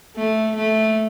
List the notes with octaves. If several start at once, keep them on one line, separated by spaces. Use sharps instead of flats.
A3
A3